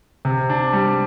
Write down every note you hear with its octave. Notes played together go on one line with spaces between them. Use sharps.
C3
D4
G3